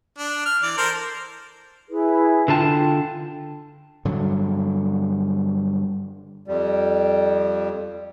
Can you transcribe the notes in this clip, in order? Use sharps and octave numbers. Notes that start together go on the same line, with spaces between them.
D4
F6
E3 D5
A4 A#4 C5
E4 G#4 B4
D3 F4 G5 A5
G2 D3 F#3
F2 G3